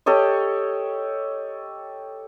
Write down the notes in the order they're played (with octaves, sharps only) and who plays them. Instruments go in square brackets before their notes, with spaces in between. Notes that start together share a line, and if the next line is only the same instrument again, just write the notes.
[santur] G4 A4 C#5 D#5